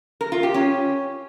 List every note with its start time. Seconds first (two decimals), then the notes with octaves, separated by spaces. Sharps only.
0.21 A#4
0.32 F4
0.43 G4
0.54 C#4